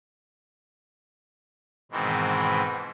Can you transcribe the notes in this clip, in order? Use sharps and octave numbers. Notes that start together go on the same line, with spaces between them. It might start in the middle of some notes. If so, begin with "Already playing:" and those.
G#2 B2 D#3 E3 C4